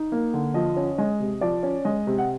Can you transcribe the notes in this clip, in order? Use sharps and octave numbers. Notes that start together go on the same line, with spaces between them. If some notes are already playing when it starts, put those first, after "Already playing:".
Already playing: D#4
A#3
D3
F3 D#5
C#4
G#3 D#5
C3
F3 D5
C#4
G#3 D#5
C3
F#5